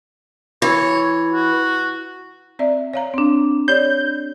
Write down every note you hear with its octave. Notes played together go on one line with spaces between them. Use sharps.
E3 C#5
F#4
C4 D5 E5
C#5 F5 A#5
C4 D4
D4 G4 C#5 D5 G6